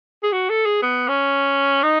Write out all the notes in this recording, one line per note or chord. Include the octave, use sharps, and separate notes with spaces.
G#4
F#4
A4
G#4
B3
C#4
D#4